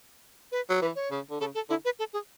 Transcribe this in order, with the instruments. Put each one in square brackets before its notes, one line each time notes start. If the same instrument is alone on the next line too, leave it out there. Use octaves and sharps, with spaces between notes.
[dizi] B4
[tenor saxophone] F#3
[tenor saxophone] E3 [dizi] B4
[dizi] C#5
[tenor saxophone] C#3
D3
[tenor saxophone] C#3 [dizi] A4
[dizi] A4
[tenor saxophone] D3 [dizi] E4
[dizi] B4
A4
G#4